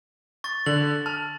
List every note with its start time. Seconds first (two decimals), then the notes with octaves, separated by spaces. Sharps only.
0.44 C#6 A6
0.66 D3 F#7
1.06 A5 F6